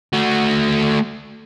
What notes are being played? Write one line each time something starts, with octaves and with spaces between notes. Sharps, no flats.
A3 F#4